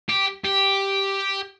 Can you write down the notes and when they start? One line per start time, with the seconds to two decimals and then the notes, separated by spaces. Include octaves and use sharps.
0.09 G4
0.44 G4